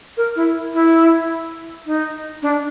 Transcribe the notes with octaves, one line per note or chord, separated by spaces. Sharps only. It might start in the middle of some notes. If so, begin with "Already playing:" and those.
A#4
E4
E4
D#4
D4